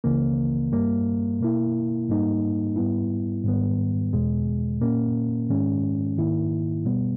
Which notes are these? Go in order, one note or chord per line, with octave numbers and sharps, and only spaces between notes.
C#2 C#3 E3 A#3
G2 G3 A#3
B2 A#3 E4
G#2 G3 A#3 D#4
G#2 G3 B3 E4
G#2 D#3 G3 B3
E2 B2 G#3
A#2 A#3 C#4
G#2 D#3 G#3 C#4
G#2 D#3 A#3 E4
B2 G3 B3